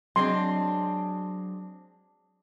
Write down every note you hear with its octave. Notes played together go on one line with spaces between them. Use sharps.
F#3 G#3 C4 D4 C6